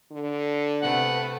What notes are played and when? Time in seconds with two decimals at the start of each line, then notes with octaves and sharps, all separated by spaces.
0.12 D3
0.82 C3 A3 B3 F#5